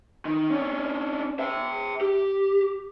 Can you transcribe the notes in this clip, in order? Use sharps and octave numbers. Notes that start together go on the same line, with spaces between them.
D#3
C#4 D4
E5 G5
G4